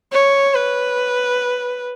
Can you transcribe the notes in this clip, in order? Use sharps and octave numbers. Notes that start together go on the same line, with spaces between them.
C#5
B4